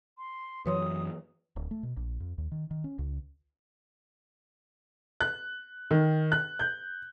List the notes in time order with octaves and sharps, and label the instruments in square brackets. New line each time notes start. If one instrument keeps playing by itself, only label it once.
[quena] C6
[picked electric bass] F#2 E3 F#3 [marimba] B4 C#5 C6 [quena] D#6
[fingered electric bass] D1
A3
B2
A#1
F2
D#2
D#3
D#3
C#4
C#2
[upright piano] F#6
D#3
F#6
G6